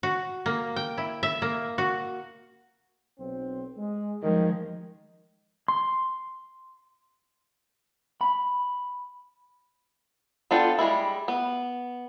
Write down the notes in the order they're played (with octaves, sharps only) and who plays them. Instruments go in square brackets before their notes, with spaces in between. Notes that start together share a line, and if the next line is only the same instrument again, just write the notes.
[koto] F#4
A#3
G5
E4
E5
A#3
F#4
[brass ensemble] B1 C4
G#3
[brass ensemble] F#2 G3 [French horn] D#3 [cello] F3 G#3
[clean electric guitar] C6
B5
[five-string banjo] B3 D4 F4 A4 G5
G3 G#3 C4 E4
B3